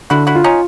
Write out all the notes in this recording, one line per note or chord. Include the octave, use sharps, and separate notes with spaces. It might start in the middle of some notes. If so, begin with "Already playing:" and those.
D3 E4 F#4
E4 F#4
F4
C#4 D#4